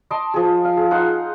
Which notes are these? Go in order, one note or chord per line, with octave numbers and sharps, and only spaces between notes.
D#5 A5 C6 D6
F3 G#4
F5
G#4
D#4 F4 F#5 C6